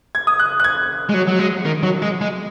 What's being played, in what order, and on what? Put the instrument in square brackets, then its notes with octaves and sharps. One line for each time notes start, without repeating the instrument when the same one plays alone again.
[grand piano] G#6
D#6
F#6
F#6
G#6
[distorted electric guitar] G#3
F#3
F#3
G#3
D#3
F#3
G#3
G#3